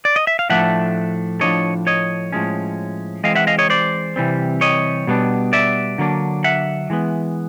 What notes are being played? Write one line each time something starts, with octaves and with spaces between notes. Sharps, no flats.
D5
D#5
E5
F5
A2 F3 A3 D4 E5 F#5
A2 F3 A#3 D4 C#5 D#5
C#5 D#5
A2 F3 G#3 C#4
E3 G#3 C4 D#5 F5
E5 F#5
D#5 F5
C#5 D#5
C5 D5
C3 E3 G3 C4
C#5 D#5
B2 G3 B3 D4
D5 E5
D3 F#3 A#3 D4
E5 F#5
E3 G#3 B3